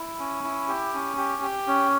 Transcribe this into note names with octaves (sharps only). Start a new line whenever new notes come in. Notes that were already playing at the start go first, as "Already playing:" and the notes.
Already playing: E4
C#4
E4
G4
C#4
G4
G4
C#4